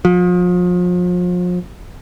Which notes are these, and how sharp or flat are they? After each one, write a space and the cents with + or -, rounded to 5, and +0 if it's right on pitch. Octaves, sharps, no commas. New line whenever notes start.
F3 +35